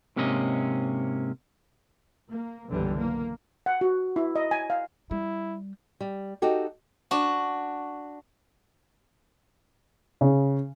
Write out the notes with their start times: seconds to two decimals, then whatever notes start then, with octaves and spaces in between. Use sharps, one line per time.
0.16 G#2 C3 A#3 C#4 A4 D#5
2.29 A#3
2.68 F#1 B1 D3 E3 G3
2.98 A#3
3.66 F#5
3.81 F#4
4.16 E4
4.36 D#5
4.51 G#5
4.70 F5
5.11 G3 E4
6.00 G3
6.42 D#4 F#4 G4 A4
7.11 D4 F#4
10.21 C#3